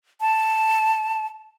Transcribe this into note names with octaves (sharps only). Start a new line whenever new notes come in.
A5